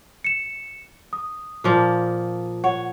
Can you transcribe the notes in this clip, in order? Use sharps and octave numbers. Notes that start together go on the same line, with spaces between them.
C#7 E7
D#6
A#2 F3 A#3
C#5 F#5